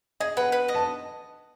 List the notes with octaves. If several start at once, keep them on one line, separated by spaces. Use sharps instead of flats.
G#4 D#5
B4 F#5
B4
D#5
A5